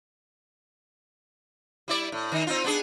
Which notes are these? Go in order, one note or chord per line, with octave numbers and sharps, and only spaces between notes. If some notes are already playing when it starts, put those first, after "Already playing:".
G3 E4 D5
A2
D#3 D#4
C4 D#4 F4
B3 D4 G#4